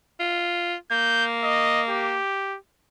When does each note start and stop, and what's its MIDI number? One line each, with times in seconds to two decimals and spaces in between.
0.20 0.75 65
0.91 2.17 58
0.91 1.25 91
1.44 1.82 75
1.90 2.58 67